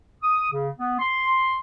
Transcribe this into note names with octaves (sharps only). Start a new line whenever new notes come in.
D#6
C#3
B3
C6